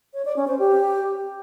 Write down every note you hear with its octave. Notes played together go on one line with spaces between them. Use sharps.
C#5
D5
C#4
C5
G4